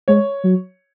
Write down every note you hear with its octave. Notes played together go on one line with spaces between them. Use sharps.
G#3 C#5
F#3